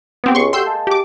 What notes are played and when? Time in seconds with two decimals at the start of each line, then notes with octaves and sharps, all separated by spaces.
0.24 B3 C4 G4
0.35 C#2 C6 C#6
0.53 A3 F#4 G4 C6 E6 G6
0.65 G#3 A#3 A5
0.87 G4 D6